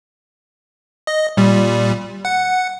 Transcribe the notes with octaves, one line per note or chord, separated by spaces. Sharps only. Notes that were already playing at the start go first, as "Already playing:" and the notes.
D#5
A#2 G3
F#5